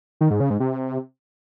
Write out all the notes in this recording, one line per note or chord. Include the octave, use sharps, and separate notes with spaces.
D#3
G#2
C#3
G#2
C3